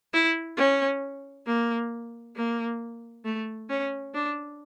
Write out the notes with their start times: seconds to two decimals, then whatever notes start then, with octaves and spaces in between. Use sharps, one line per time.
0.13 E4
0.58 C#4
1.47 A#3
2.36 A#3
3.25 A3
3.69 C#4
4.14 D4